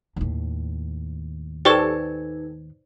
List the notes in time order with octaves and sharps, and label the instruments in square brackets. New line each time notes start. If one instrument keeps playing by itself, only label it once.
[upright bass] D#2 A2
[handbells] D#4 B4 G#6 [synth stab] G4 A4 [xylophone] C5 D5 C#6